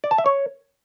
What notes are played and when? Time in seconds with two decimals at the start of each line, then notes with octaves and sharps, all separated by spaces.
0.04 D5
0.11 A5
0.18 E5
0.26 C#5